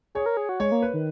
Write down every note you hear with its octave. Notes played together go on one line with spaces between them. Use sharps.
G#4 C#5
A#4
G#4
F#4
G#3 C#5
A#3
B4
D#3